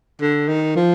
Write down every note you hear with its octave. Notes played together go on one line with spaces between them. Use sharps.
D3
D#3
F3